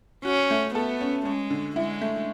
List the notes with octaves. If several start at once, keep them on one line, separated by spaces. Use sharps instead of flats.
C#4 F#4
A3
B3 A4
C#4
G#3 C#4
D3
G#3 E4
A3